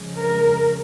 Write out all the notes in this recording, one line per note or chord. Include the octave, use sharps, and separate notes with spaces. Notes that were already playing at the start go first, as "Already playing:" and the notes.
Already playing: F2 C#3 G#3
A#4